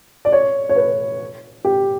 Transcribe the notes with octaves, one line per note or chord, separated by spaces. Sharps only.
D5
C#5
C#5
B4
G4